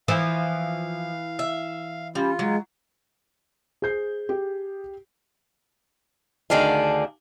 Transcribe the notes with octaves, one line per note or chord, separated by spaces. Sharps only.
E3 F3 F5
E5
G3 C#4 F4
F#3 G#3
G#4 C5 G6 C7
G4
D2 D3 D#3 D4 G#4 F5